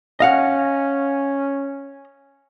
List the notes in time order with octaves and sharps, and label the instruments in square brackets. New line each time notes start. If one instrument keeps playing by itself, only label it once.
[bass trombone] C#4 [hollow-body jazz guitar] D#5 F5 F#5